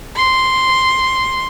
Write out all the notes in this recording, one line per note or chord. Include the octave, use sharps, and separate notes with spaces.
C6